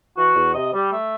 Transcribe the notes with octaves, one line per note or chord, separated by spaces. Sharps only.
E3 F#4
E2
C3 D#5
G3
A3 E5